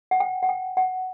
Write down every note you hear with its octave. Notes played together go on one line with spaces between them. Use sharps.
F#5
G5
F#5
G5
F#5